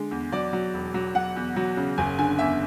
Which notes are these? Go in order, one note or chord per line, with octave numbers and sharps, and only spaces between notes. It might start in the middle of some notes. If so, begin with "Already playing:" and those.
Already playing: D3 G#3
E2
F#3 D5
F#3
E1
F#3
F#3 F#5
E2
F#3
C#3
F#1 G#5
D3 G#5
E2 E5